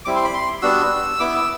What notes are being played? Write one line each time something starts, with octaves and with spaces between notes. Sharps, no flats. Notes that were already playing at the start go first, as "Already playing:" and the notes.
G3 C4 E4 D6
C6
B5
C6
G3 B3 D4 F#4 E6
B3 E4 D6
E6